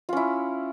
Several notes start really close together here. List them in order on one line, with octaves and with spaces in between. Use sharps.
F4 C#4 E4